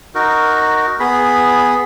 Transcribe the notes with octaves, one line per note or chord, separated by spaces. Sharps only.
D#4 F#4 A#4
B3 G#4 B5